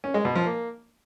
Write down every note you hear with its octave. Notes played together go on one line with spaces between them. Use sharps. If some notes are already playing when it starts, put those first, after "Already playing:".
C#4
G#3
B2
F3
A#3